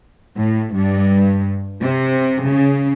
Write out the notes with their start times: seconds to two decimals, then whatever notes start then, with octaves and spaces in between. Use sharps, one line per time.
0.37 A2
0.74 G2
1.81 C3
2.48 C#3